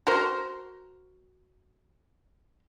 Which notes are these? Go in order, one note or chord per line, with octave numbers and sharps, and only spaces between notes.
F#4 A#4 C5